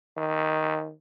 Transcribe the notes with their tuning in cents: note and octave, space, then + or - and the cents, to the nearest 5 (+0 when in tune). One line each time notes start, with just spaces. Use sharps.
D#3 +5